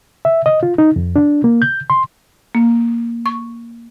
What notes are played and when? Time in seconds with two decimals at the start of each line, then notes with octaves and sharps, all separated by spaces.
0.25 E5
0.46 D#5
0.63 F4
0.78 D#4
0.96 F2
1.16 D4
1.44 A#3
1.62 G6
1.90 C6
2.55 A#3
3.26 C#6